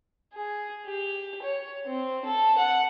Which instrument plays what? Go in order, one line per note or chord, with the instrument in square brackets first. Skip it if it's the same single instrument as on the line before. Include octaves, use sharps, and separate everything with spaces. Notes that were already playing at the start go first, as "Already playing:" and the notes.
[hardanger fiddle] G#4
G4
C#5
C4
A4
F#5